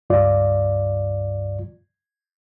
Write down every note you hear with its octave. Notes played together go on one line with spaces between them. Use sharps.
C#2 G2 F4 D5